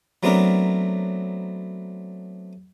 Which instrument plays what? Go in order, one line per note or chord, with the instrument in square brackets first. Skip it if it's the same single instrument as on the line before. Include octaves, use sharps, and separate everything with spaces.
[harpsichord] F#3 A3 B3 C4 D4 A#4